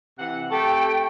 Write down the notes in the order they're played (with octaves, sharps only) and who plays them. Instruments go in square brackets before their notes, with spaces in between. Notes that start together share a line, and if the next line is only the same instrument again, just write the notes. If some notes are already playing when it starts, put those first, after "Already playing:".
[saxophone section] C3 E3 F#5
[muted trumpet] A3 [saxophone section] C4 G4 A4 [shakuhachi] G5